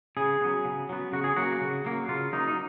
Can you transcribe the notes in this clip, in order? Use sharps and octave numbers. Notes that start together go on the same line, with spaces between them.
C#3 G#4
F#3 B3
C#3
F#3 B3
C#3 F#4
G#4
F#3 A#3 F#4
C#3
F#3 A#3
C#3 F4
F#3 A#3 D#4
D#4